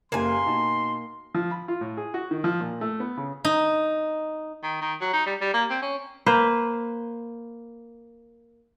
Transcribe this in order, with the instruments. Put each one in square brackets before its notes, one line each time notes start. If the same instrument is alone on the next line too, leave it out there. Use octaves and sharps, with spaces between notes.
[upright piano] F#1 G3 [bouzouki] A#3 G#5 [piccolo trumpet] C6
[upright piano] B2 D#4 A5
[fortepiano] F3
B5
F4
A2
G#4
F#4
D#3
F3
A#2
A3
B3
C#3
[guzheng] D#4
[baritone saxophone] D#3
D#3
F#3
D#4
G3
G3
A#3
C4
C#4
[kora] A#3 B4 C5